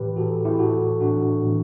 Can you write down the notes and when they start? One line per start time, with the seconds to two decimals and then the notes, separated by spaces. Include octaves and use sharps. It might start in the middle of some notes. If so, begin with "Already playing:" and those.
Already playing: A2 E3 G4 B4
0.16 A2 E3 F#4 A4
0.45 E4 G4
0.59 A2 E3 F#4 A4
1.00 A2 E3 D4 F#4
1.42 A2 E3